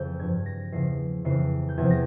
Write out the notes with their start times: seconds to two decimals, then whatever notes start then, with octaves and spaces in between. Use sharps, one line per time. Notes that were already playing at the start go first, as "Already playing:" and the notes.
Already playing: F2 C#3 E3 G6
0.19 G2 F3 G#6
0.46 A#6
0.72 E2 C#3 F3 C7
1.25 F2 C#3 E3 C7
1.69 G6
1.77 E2 C3 F3 G#6
1.90 A#6